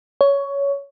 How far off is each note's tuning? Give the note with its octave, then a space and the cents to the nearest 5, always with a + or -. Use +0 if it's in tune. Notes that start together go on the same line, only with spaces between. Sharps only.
C#5 +15